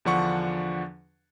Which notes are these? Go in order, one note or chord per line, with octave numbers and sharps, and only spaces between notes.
E2 D3 F3 D4 F#5 C#6